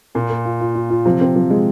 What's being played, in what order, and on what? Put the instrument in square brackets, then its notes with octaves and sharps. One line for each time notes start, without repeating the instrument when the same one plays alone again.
[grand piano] A#2 [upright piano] A#3
[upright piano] A#3
F4
F4
F4
F4
[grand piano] C3 [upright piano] F3
[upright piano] C4
F3
G#3